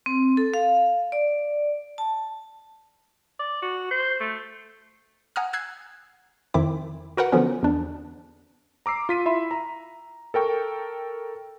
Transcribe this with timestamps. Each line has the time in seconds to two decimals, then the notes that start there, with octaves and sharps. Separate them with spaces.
0.06 C4
0.37 A4
0.54 F5
1.12 D5
1.98 A5
3.39 D5
3.62 F#4
3.91 C5
4.20 A3
5.36 F#5 G#5 A#5 D#6 F6
5.53 E6 F#6 G#6 C7
6.54 F2 D#3 C4 E4 D6
7.17 F#4 A#4 B4 F#5
7.32 D3 F3 F#3 B3 C#4
7.63 E2 D4
8.86 A#5 D6 E6 C7
9.09 F4 B6 D#7
9.26 E4 E5 B5 C6
9.51 A#5
10.34 A4 A#4 G5 C#6